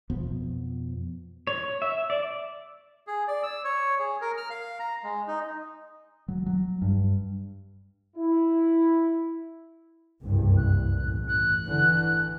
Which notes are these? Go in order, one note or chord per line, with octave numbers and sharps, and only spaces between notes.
F2 B2 F3 B3
C#5
E5
D5
G#4
D5
E6
C#5
G#4
A#4
F6
F5
A#5
G#3
D#4
F#3
F#3
G2
E4
F#1 C2 G2
F#6
A1
F#6
D3 E3